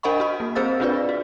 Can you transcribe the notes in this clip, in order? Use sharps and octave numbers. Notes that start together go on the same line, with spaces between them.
D4 A#4 D#5 F#5 B5 C#6
F#4 D#5
A#3
C4 G#4 C5 F5 E6 A6
C4 D4 F4 G#4 B4 D5
F#4